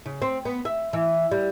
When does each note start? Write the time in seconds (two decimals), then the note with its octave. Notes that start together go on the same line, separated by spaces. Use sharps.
0.06 C#3
0.22 C4
0.45 B3
0.65 E5
0.93 E3
1.32 G3